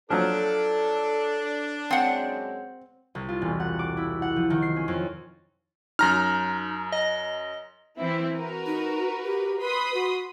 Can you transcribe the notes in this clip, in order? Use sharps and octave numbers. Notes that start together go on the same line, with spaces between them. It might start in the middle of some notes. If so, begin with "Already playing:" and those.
F3 F#3 D4 A4
F#2 G#3 C4 C#5 F#5
C2
F4
E1
F#5
D6
E4
F#5
F3
D#3
C7
C#4
F2
F#2 D#4 A#5 F6
D#5
E3 C4 E4
F#4 A#4 B4
D#4
G4
B4 B5 C6 D#6
F#4